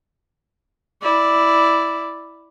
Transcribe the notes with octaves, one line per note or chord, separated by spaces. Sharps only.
E4 D5